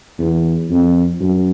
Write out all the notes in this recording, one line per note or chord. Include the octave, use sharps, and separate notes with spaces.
E2
F2
F#2